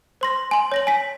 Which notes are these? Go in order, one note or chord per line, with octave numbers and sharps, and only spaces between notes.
C5 C6 A#6
G#5 C6
C#5 A#6 F#7
G#5 B6